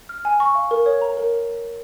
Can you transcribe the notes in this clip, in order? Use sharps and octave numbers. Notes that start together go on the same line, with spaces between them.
F6
G#5
C#6
F5
A#4
C#5
A#5
A#4